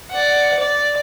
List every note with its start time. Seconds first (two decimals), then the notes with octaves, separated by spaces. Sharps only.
0.11 D5 F#5
0.59 D5